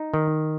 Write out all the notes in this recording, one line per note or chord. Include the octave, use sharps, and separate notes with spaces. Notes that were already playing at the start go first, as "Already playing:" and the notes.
Already playing: D#4
D#3